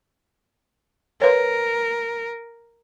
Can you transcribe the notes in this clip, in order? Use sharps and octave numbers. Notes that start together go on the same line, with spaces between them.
A#4 B4 C#5